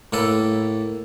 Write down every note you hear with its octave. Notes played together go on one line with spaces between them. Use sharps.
A2 A#3 A4 B4